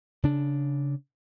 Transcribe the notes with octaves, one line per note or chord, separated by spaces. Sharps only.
C#3 D4